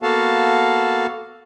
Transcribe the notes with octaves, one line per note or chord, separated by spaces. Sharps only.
A#3 B3 F#4 A4 F5 A5